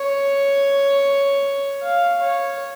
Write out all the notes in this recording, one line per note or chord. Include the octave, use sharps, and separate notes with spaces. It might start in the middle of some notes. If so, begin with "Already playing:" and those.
Already playing: C#5
F5
C#5